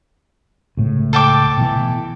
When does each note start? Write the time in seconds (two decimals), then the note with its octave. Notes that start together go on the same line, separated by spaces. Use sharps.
0.77 C#2 A2
1.13 A4 G5 D6
1.57 B2 E3